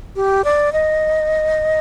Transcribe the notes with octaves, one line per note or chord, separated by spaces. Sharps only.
G4
D5
D#5